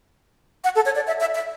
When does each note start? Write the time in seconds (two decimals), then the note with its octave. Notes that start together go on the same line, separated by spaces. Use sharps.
0.64 F#5
0.76 A4
0.86 C#5
0.96 D5
1.07 E5
1.20 E5
1.35 E5